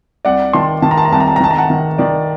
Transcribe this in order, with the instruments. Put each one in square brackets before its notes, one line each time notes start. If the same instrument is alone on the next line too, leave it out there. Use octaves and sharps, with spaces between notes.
[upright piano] C2 D5 F#5
D#3 A5 C6
D#3 A5
A#5
A5
A#5
C2 A5
A#5
A5
A#5
D#3 A5
A#5
F#5 A5
D#3
D#3 D5